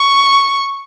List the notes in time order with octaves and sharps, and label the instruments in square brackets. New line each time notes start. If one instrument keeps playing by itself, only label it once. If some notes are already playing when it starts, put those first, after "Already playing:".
Already playing: [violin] C#6